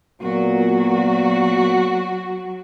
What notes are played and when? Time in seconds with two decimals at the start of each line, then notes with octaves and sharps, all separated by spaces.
0.22 A#2 F#3 A#3 B3 F#4